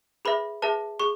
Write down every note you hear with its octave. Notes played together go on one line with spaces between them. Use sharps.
G#4 B4 E5 B5
G#4 B4 E5 A5
G#4 C#6